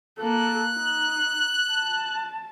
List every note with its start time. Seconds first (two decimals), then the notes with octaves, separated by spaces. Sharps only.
0.19 A#3 A4 F#6
0.75 D#4
1.71 A5